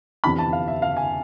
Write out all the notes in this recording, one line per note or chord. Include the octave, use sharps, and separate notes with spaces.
F2 C3 E3 B3 D4 B5
A5
F5
E5
F5
G#5